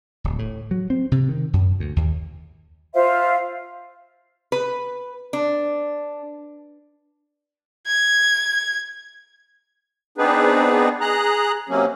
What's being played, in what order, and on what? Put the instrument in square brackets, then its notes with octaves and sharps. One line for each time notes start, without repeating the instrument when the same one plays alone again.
[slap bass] D1
A2
F#3
C4
C3
D#3
F#2
D2
D#2
[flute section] F4 C5 E5 F5
[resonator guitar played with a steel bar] B4
D4
[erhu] G#6
[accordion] B3 C4 D4 D#4 G#4 B4
G#4 A#5 F#6
C3 F#3 A#3 C#4